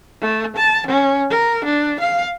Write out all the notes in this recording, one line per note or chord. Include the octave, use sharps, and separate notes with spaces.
A3
A5
C#4
A#4
D4
F5